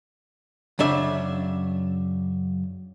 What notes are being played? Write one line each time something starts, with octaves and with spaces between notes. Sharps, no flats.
F#2 C#3 D4 E5